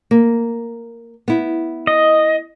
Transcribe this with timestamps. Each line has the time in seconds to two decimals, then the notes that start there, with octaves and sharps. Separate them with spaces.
0.11 A#3
1.28 B3 E4
1.87 D#5